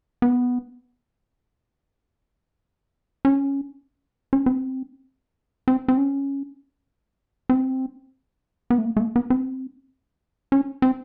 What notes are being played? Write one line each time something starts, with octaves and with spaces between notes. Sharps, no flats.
B3
C#4
C#4
C4
C4
C4
C#4
C4
B3
A3
A#3
A3
A#3
B3
C4
C#4
C4